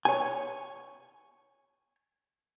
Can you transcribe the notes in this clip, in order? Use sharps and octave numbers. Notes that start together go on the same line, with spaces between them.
C#5 G#5